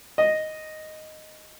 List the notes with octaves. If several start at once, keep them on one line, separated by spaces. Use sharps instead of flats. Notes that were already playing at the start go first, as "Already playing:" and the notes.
D#5